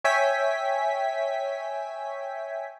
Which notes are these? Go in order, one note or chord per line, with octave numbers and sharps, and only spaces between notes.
C#5 E5 G5 G#5 B6